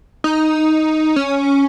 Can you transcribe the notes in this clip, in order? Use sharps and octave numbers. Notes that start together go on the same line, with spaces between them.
D#4
C#4